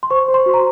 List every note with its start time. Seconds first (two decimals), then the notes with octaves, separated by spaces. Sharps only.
0.03 C6
0.10 C5 C#6
0.28 C5
0.34 C6
0.46 F#4
0.54 A#5